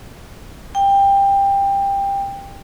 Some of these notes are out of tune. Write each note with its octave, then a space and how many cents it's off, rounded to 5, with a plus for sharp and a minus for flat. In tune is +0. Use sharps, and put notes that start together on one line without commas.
G5 +15